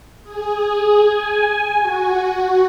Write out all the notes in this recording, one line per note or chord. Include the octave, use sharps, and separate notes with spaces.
G#4
G#5
F#4